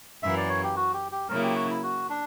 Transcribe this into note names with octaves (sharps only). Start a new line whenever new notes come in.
F#2 E3 A#3 E5
D5
C#5
G4
F#4
G4
G4
C#3 F#3 A#3 C#4 E4 A#4
G4
F#4
E4
F#4
D4